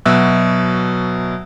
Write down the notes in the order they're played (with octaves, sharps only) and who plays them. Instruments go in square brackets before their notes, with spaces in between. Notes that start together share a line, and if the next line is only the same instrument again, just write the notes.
[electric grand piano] B2 F#3 E5 E6 F#6